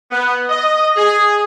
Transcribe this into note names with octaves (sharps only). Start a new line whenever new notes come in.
B3
D#5
G#4